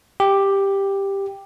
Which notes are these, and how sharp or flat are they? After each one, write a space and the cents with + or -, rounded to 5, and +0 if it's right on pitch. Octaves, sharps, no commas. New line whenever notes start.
G4 +5